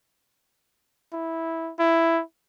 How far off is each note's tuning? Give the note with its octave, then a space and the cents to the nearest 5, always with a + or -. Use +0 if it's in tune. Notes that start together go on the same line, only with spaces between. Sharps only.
E4 -10
E4 +5